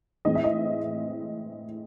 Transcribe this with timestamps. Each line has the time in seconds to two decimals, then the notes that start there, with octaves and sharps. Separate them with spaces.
0.25 A2 E3 G#3 C4 D#5
0.35 E5
0.44 D#5